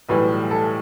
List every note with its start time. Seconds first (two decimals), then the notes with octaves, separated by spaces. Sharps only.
0.09 B1 A2 E3 G3 B4
0.51 A4